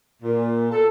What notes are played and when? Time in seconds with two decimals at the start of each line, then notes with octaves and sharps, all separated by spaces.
0.22 A#2
0.71 A4